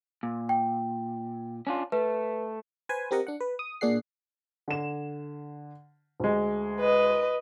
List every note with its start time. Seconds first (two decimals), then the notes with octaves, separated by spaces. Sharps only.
0.23 A#2
0.49 G5
1.67 C#4 D4 F4
1.92 A3 B4
2.89 B4 C5 G#5
3.11 C4 G4 A#4 D#5 F#5
3.27 D4 F#5
3.40 B4
3.59 D#6
3.81 A#2 D4 G#4 F#5 C7
4.68 D3 E7
6.20 D2 G#3
6.80 B4 D#5